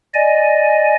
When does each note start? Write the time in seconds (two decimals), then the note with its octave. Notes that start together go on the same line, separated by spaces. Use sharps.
0.14 D5 D#5 G#5